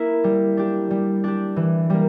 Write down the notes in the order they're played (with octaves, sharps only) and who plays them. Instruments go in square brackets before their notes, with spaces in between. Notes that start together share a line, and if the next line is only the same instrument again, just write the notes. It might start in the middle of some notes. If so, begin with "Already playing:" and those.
Already playing: [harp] A#3 E4
G3
D4 G4
G3
D4 G4
E3
G3 A#3